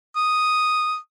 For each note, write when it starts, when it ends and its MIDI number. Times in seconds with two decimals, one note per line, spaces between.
0.16 0.96 87